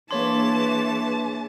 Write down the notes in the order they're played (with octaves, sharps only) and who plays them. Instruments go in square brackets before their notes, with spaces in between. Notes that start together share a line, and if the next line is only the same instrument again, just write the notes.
[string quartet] E3 A5 [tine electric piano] A#3 C#5 C6 [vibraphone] D4 G#4 B4